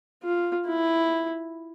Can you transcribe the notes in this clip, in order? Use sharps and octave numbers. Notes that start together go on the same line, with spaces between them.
F4
E4